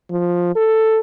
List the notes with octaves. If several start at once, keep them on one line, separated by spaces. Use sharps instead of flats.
F3
A4